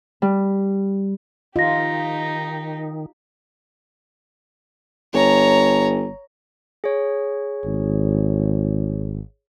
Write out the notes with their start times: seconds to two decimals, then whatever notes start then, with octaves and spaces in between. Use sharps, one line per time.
0.22 G3
1.56 D#3 D#4 F4 G4 D#5 A#6
5.14 G1 C#5 A#5
6.84 G#4 C#5
7.64 G#1